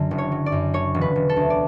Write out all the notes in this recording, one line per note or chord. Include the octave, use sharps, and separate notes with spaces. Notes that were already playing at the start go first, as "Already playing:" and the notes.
Already playing: F#2 D3 F#3
F#1
C#5
F#3
D5
F#2
D3 C#5
E1
B4
E1
A4
D2
D5